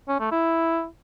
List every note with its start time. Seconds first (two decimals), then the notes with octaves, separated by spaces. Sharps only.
0.08 C#4
0.20 A3
0.31 E4